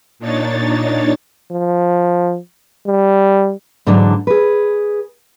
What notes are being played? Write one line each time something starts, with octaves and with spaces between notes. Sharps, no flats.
A#2 D4 D#4 C#5 A6
F3
G3
G#2 D3 E3 F#3 D4
G#4 B4